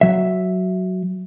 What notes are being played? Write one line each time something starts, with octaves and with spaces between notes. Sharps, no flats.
F#3 E5